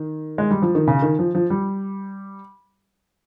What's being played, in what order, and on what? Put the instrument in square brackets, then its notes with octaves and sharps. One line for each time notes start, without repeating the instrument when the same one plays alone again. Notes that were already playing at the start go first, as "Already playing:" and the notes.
Already playing: [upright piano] D#3
G#3
G3
F3
D#3
C#3
D#3
F3
F3
G3